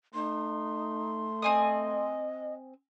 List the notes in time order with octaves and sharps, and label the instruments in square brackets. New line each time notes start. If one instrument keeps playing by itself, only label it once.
[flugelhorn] A3 [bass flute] D#4 [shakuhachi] C6
[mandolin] C4 G#5 D#6 [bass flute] D#5